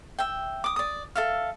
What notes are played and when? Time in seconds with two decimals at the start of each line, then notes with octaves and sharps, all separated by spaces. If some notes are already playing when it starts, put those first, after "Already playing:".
0.19 E5 G5
0.64 D6 D#6
0.76 D5 D#6
1.15 A4 E5 F5